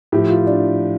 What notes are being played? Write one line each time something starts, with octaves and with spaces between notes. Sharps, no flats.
A2 F3 G4
F4
D4